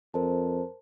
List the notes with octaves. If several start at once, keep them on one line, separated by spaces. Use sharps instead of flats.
F2 A#4 C5 A5